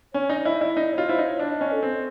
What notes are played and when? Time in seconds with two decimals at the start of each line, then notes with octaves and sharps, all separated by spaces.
0.14 C#4 C#5
0.29 D#4 D5
0.40 D5
0.45 E4 D#5
0.61 E4 D5
0.77 D#4 D#5
0.93 C#5
0.98 F4
1.09 E4 C5
1.19 D#4
1.24 C#5
1.39 D4 D#5
1.61 C#4
1.71 A4
1.83 C4